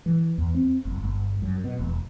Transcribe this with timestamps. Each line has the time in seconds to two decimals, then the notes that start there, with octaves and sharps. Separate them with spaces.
0.06 E3
0.38 E2
0.54 C4
0.85 F#1
1.00 G1
1.42 F#2
1.64 B2
1.79 E1